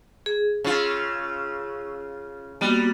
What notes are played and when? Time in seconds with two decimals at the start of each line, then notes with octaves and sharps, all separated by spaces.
0.26 G#4
0.65 C#3 F4 C#6 E6
2.61 G3 A#3 B3 F#4